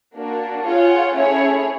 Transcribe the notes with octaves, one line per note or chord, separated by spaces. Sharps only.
A#3 D4 F#4
F4 G#4 C#5 F#5
A3 C#4 E4 G#4 C#5